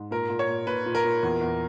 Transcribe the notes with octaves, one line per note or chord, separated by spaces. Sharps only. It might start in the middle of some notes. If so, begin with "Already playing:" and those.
Already playing: G#2
A#2 A#4
A#2
C#5
A#2
A#2 B4
A#2
A#4
A#2
E2
E2